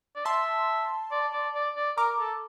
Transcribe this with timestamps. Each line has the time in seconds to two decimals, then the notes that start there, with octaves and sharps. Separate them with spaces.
0.16 D5
0.25 E5 A5 C6
1.12 D5
1.33 D5
1.55 D5
1.76 D5
1.97 A#4 A#5 D6
2.19 A4